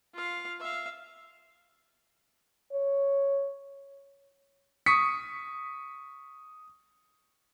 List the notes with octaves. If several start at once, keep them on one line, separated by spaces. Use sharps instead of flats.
F4 F5
E5 F5
C#5
C#6 D#6 B6 C#7